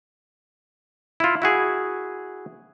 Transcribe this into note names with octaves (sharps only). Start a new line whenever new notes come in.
E4 F4
E4 F#4 G#4